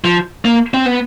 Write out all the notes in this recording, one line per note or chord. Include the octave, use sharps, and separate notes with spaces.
F3
A#3
C4
B3